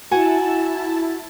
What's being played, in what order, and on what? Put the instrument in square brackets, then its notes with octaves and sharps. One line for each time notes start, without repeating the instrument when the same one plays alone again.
[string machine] E4 A5 [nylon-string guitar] F#4 F#5 G#5